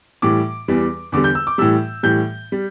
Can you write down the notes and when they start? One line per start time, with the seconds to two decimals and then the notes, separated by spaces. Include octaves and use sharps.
0.22 A2 E3 G3 D6
0.68 E2 E3 G3
1.12 E2 D3 G3 D6
1.24 G6
1.35 E6
1.47 D6
1.58 A2 E3 G3 E6
2.03 A2 E3 G3 G6
2.52 G3